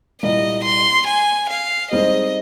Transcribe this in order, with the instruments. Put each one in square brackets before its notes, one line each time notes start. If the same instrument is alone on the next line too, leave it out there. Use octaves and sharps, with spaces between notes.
[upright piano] C2 A#2 G3 [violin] D#5
[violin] C6
G#5
F5
[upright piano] G#2 G3 C4 D#4 G#4 [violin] D#5